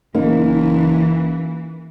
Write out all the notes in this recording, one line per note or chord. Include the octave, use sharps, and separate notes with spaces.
F#1 E3 A#3 D#4